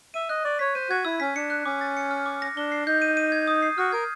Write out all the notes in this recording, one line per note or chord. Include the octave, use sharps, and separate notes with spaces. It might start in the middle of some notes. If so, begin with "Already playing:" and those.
E5 D#7
D#5 F#6
D5 C#6
C#5 B6
C5 D#7
F#4 G#6
E4 E6
C#4 B6
D4 C#7
F#6
C#4 D6
A6
C#7
F6
D6
A#6
D4 G7
C7
D#4 G6
D#7
D#7
G#6
D#6
C7
F#4 F6
A#4 G#6